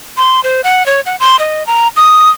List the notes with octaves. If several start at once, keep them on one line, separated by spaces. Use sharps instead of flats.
C6
C5
F#5
C#5
F#5
C6
D#5
A#5
D#6